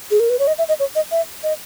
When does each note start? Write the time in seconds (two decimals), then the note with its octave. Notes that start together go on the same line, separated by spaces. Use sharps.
0.11 G#4
0.20 A#4
0.30 B4
0.39 C#5
0.47 D#5
0.58 E5
0.69 D#5
0.80 C#5
0.95 D#5
1.11 E5
1.43 D#5